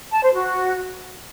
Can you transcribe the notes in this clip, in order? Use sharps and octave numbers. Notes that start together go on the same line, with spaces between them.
A5
C5
F#4